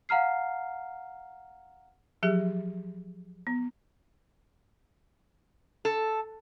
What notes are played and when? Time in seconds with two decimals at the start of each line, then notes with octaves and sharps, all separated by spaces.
0.09 F5 F#5 A#5 F6 C7
2.23 F3 F#3 G4 G#4
3.47 B3
5.85 A4